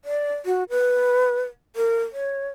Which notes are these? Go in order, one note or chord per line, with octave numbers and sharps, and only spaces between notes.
D5
F#4
B4
A#4
C#5